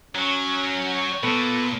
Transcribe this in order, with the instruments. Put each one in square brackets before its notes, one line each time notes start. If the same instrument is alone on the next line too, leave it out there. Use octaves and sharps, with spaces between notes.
[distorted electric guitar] F#3 [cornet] C#4 [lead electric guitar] A#4 C#5
[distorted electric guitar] A#2 [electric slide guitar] B3 B4 [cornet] A4